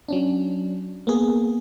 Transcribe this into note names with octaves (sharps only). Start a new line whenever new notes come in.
F#3 C#4 D4
A#3 B3 G#4